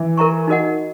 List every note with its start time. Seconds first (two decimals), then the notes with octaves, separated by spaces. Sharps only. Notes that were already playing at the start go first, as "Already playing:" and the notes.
Already playing: E3
0.17 A#4 E5 A#5 C#6
0.48 D#4 F#4 A#4 D#5 F#5